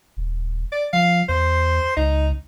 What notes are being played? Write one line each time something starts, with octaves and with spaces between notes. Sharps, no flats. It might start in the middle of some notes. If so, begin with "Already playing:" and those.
D#1
D5
F3 F5
E2 C5
C#2 D#4